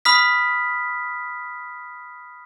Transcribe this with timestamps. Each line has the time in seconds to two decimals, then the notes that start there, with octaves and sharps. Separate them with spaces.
0.05 B5 D#6 F6 B6